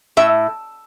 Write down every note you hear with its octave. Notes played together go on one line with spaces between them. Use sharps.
A2 E5